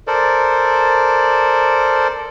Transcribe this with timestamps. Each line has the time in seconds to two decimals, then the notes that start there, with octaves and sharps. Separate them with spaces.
0.07 A4 A#4 C5 D5